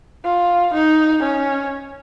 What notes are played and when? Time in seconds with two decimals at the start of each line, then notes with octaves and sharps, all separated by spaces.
0.25 F4
0.74 D#4
1.22 C#4